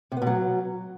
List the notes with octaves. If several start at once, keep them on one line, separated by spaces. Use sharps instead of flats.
C3
B3
B2
F#3